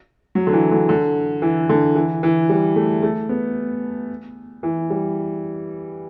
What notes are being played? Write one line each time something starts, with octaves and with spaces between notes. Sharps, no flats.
F#3
D3
E3
D3
D3
E3
D3
E3
E3
G3
A3
A3
B3
E3
G3